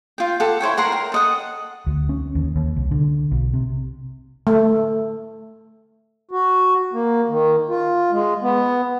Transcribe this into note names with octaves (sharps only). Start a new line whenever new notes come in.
F4 G5
G4 A4 F#5
E4 C5 C#5 G5
A#4 F#5 A#5 C6
A#4 G5
A4 D#5 F#5
D2
C#4
D#2
D#2
C2
D3
B1
C3
A3
F#4
A#3
D#3
F4
G#3
B3